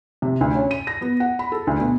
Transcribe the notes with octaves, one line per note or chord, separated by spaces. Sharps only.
C3
D2
C#4
D#7
A#6
B3
F#5
B5
A4
D2
B2